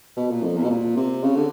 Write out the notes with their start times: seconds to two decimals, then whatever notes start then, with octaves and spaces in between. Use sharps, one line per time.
0.17 B2
0.30 A#2
0.44 F2
0.56 E2
0.64 B2
0.70 A#2
0.96 C3
1.23 C#3
1.36 D3